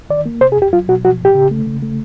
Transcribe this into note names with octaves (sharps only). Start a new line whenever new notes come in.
D#3 D5
A#3
C3 C5
G#4
F2
G4
F#3 F4
B2 F#4
F3 F#4
A2 G4
C#3
A3
C#3
A3